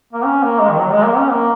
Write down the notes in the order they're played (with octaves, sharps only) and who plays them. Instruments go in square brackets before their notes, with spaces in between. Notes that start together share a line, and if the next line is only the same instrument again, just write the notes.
[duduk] A#3
C#4
A#3
G#3
D#3
F#3
G#3
A#3
C#4
A#3